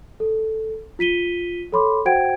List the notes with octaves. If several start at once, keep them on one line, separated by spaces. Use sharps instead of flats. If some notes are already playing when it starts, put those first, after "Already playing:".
A4
F4 B6 D#7 G7
A4 C#5 B5 C6 D6
F#4 C5 F#5 G5 G#6 D7